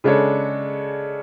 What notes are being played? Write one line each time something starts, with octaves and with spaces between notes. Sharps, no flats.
C#3 G#3 D4 A4 C#5